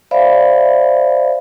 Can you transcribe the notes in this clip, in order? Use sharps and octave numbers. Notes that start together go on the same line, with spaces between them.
C5 D5 E5 F5 B5